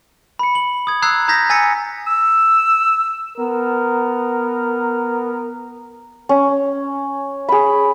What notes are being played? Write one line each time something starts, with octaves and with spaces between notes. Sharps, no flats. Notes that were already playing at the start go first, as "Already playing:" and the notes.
B5 C#7
F#7
D#6 G#6
A#5 D#6 E6 F#6 G#6 C7
A#5 D#6 G6 G#6 A#6 B6
G#5 E6 A6 B6 C#7
E6
B3 A#4
C#4
G#4 B5